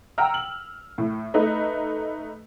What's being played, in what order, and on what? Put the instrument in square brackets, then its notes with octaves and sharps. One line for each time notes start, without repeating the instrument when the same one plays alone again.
[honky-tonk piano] F#5 G5 A#5 E6 F6
F#7
A2
A3 D#4 B4